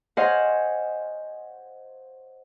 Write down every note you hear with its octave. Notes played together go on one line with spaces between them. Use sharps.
C5 C#5 D#5 F5 F#5 G#5